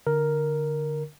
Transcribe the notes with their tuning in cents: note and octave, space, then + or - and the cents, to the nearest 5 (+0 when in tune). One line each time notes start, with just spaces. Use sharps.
D3 +0 A#4 +0